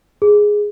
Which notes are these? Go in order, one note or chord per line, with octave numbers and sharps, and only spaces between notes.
G#4